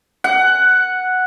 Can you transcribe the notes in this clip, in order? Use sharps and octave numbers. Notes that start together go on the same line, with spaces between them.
F#5